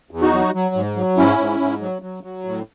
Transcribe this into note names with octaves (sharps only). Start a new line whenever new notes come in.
E2
D#4 F#4
F#3
F#3
G#2
F#3
G#2 C#4 E4
G#2
G#2
F#3
F#3
F#3
A2